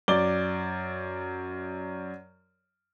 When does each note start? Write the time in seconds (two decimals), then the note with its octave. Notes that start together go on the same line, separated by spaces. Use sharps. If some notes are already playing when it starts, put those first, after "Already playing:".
0.08 F#2 D5 D6 G7